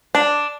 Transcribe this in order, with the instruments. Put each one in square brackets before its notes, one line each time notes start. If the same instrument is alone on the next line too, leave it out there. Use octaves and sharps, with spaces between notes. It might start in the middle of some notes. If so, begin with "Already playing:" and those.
[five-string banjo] D4